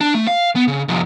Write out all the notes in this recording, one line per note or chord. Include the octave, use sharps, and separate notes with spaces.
D4
A3
F5
B3
C#3
C2 F2